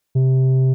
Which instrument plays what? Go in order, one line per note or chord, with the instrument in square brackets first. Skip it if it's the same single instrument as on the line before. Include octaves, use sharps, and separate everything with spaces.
[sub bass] C3